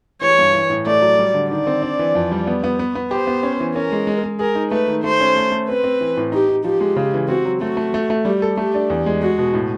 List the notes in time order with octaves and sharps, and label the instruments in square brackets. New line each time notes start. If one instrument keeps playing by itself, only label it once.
[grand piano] E3 [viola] C#5
[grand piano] G2
E3
A2
[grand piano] A3 [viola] D5
[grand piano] F#3
G3
D3
[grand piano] D#3 [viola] D5
[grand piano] C4
D4
E3
F2
G3
B3
B3
B3
B3
[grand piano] G4 [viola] C5
[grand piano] B3
C#4
E3
[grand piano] C#4 [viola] A#4
[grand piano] G#3
G#3
G#3
[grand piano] G#4 [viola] A#4
[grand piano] D#4
[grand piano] A3 [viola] B4
[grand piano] D#3
[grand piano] A3 [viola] C5
[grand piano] C#4
A3
A3
[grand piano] C4 [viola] B4
[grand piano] C4
E3
A2
[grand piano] D#4 [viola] G4
[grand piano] D#4
[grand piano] F3 [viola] G4
[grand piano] G#3
C#3
E3
[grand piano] C4 [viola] F#4
[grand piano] F#3
[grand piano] A3 [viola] F#4
[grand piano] A3
A3
A3
[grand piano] G3 [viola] G4
[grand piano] A4
[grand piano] A3 [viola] G4
[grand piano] D4
E2
G#3
[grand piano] G#3 [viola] F#4
[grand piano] B2
A2